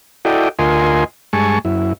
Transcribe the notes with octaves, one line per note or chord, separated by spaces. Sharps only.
E4 F#4 A4 D5 D#5 G5
D2 F4 A#4 D#5 G#5 C6
G2 G#3 G#5 A5 C#6
F#2 E4